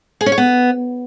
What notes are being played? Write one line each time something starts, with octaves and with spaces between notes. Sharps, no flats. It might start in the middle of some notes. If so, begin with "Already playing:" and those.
G#4
C#4
C#5
B3